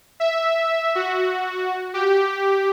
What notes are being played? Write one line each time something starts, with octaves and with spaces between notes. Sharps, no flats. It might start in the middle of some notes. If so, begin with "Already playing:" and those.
E5
F#4
G4